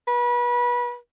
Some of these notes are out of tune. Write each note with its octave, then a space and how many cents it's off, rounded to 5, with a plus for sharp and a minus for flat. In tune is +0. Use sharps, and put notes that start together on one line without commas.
B4 -30